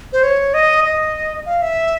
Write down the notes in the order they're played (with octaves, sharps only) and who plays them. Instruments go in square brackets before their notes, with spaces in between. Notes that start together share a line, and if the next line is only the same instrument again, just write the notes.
[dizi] C5
C#5
D#5
D#5
F5
E5